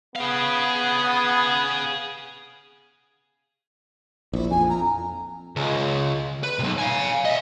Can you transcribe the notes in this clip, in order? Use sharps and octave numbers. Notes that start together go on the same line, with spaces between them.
B3 G#4 F5
A#1 E4
F2 G#5
A#5
C#2
B4
B1 C3
F5 G#5
D#5 E5